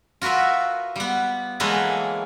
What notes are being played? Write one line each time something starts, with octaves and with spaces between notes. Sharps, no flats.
F4 F#4 A#4 B4 E5
G3 B3
E3 F#3 G#3 A#3 A4 B4